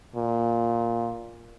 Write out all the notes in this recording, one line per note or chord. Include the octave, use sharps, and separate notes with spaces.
A#2